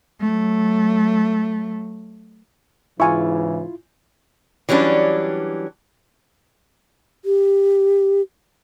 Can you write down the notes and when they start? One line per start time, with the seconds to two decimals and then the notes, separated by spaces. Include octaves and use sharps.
0.21 F#3 A3
3.00 G#2 C#3 E3 E4 F4 G#5 C#6
4.69 E3 F#3 G3 C#4 D4
7.25 G4